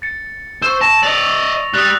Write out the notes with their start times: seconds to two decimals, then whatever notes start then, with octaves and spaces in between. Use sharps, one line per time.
0.02 A6 C#7
0.62 C5 C#6 E6
0.81 A5 A#6
1.03 D5 D#5 A6 F7
1.74 G3 D#6 F#6